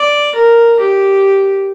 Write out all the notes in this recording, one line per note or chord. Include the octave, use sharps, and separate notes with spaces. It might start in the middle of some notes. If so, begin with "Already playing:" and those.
Already playing: D5
A#4
G4